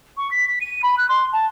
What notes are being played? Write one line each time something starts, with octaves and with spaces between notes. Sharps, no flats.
C#6
B6
B6
D#7
B5
F#6
C6
A5